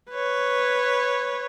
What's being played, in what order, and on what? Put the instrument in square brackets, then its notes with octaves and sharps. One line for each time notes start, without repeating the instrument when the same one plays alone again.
[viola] B4 C#5